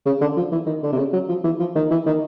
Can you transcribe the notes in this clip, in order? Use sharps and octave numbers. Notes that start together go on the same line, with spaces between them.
C#3
D3
F3
E3
D#3
D3
C3
C#3
F#3
F3
E3
F3
D#3
E3
D#3